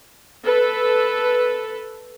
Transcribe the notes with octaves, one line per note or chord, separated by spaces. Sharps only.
A4 B4